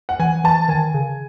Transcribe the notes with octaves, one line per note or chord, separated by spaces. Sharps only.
F#5
E3 G#5
E3 A5
D#3 G#5
C#3